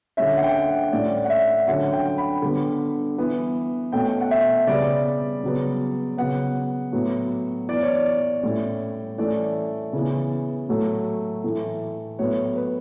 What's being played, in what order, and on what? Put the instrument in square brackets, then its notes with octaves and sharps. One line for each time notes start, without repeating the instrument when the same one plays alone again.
[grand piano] D3 G3 C#4 E5
F#5
G5
F#5
A2 G3 C#4 D5
F#5
E5
D3 F#3 C#4 F#5
G5
B5
D3 G3 B3
E3 B3
B2 A3 C#4 G5
F#5
E5
C#3 G3 B3 D5
C#3 F#3 B3
C#3 F#3 B3 F#5
A2 F#3 B3
E3 B3 D5
C#5
D5
A2 G3 C#4
E3 A3 C#4 D5
C#3 E3 B3
A2 F#3 A3
A2 E3 A3
A2 F#3 B3 C#5
B4